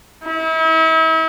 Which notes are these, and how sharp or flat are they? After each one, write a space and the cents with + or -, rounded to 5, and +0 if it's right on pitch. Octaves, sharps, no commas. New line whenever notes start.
E4 -40